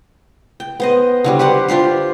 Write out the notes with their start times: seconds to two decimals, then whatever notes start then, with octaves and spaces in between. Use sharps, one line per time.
0.60 G5
0.80 B3 C5 D#5
1.24 D3 F#3 G3
1.39 G4 B4 C5 F#5
1.68 D4 F4 G4 C5